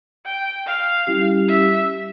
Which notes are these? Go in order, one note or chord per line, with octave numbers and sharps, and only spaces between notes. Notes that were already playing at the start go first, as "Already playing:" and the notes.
G5
F5
G3 C#4 E4 G4
E5